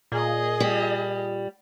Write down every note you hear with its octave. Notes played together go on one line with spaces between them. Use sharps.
A#2 G#4 D#5
G3